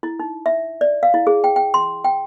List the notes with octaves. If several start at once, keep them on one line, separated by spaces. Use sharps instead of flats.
E4
D#4
E5
D5
F5
E4
G#4
G5
G5
C6
G5